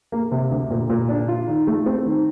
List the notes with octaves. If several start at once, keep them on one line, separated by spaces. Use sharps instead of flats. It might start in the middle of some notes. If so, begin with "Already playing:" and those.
A#3
C3
D2
A#2
A#2
D4
F4
D#3
A3
C4
D#3